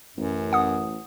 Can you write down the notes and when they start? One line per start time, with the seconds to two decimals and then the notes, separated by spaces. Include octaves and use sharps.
0.17 A1 F#2
0.53 F#5 D#6